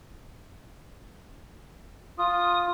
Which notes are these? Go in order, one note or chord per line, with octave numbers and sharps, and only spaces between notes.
F4 D#6